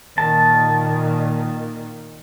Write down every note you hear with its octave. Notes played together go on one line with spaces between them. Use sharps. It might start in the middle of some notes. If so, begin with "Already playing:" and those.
A#2 D#3 A5